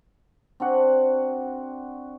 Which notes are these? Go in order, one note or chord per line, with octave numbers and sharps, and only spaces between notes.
C4 D4 F#4 F#5